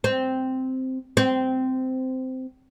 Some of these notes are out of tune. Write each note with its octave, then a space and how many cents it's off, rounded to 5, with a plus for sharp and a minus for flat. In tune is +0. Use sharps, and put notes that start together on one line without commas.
C4 -5
C4 -15